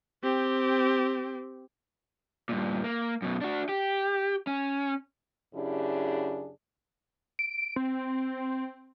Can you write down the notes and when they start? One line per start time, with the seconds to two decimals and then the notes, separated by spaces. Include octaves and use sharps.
0.23 C4 G4
2.49 G2 A#2
2.84 A#3
3.22 F#2 B2
3.41 D4 F#4
3.69 G4
4.47 C#4
5.54 F#2 C#3 D4 E4 G4 G#4
7.39 D7
7.76 C4